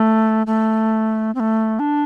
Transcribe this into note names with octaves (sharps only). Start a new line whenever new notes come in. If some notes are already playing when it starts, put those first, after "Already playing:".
Already playing: A3
A3
C4
A3
D4